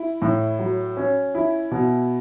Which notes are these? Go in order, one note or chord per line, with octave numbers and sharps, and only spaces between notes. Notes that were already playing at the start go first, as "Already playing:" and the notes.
Already playing: E4
A2
F#3
C#4
E4
B2